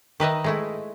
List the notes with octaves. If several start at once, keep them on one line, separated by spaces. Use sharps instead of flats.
D#3 B4 D#5 E5
G#3 A3 E4